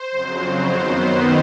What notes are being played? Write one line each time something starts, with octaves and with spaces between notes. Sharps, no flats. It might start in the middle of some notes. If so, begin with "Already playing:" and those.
Already playing: C5
F2 C#3 F#3
F#2 D#3 F#3 B3 C5